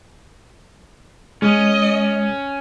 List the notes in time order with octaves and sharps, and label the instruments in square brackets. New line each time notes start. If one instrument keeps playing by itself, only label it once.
[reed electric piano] G#3 [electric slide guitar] C#4 [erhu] D#5